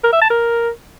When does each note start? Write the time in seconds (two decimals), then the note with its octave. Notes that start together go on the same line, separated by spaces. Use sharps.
0.04 A#4
0.13 E5
0.21 A5
0.30 A#4